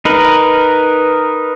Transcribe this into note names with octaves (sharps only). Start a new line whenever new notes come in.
D#4 A#4 B4